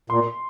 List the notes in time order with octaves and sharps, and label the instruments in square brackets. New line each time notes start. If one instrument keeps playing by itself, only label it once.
[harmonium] A#2 [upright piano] C6